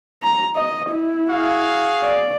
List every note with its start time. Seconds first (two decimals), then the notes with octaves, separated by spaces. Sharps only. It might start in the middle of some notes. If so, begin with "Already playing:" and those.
0.23 A#5
0.56 D#5
0.90 E4
1.30 F#4 G#4 F5
2.03 D5